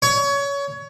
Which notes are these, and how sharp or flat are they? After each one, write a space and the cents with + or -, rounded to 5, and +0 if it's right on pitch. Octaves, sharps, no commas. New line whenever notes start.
C#5 +25